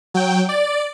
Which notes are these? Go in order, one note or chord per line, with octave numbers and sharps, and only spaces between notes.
F#3 G5
D5